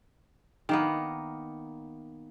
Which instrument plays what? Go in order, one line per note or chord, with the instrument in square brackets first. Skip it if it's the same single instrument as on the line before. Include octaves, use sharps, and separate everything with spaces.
[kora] D#3 A#3 B3